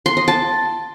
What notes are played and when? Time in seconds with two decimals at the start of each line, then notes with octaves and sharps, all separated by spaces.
0.06 C6
0.17 D#5
0.28 A5